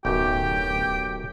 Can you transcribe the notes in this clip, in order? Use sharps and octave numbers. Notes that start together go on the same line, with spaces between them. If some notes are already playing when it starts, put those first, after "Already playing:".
D1 B1 F#2 G4 G5